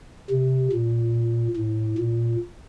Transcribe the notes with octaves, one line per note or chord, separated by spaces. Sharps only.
C3
A#2
A2
A#2